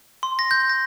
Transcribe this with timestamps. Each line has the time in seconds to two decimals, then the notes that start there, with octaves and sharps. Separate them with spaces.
0.23 C6
0.39 A#6
0.51 G6
0.70 A#6